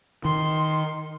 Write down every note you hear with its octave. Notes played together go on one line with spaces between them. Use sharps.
D#3 C6